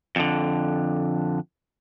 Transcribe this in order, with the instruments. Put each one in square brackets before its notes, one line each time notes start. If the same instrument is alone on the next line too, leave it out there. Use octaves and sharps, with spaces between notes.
[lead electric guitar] F2 D3